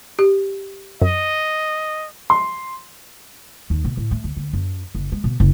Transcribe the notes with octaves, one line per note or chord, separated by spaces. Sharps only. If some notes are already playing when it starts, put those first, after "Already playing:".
G4
F#2 D#5
C6
D#2
B2
A2
A3
D2
D2
F#2
F#1
G#3
B2
F#1